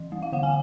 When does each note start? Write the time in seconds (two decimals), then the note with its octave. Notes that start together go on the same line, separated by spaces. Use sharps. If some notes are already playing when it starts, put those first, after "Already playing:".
Already playing: E3
0.12 G3
0.23 F5
0.32 D3 F#5
0.43 G#5